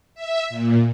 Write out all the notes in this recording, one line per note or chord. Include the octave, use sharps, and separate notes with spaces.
E5
A#2